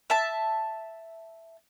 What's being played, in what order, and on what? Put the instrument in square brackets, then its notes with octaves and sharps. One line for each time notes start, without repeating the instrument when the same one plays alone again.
[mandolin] E5 A5